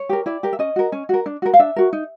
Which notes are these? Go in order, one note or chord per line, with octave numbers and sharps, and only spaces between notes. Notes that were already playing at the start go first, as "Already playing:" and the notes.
Already playing: C#5
G4 A#4
E4 D5
G4 A#4
E5
C#4 D#5
F#4 A#4
C#4
F#4 A#4
D4
F#4 A#4
F5
D4 E5
F#4 A#4
D#4